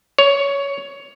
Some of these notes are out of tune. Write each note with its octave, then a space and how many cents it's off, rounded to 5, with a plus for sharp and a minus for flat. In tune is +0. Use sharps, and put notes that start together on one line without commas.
C#5 +15